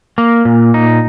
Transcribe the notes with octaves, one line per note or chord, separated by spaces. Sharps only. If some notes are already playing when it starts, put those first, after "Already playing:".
A#3
A#2
D#4